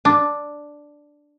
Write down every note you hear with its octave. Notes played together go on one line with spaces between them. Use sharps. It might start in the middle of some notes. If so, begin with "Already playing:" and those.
D4